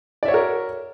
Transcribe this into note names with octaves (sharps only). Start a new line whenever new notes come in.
F#4 A#4 C#5 D5 E5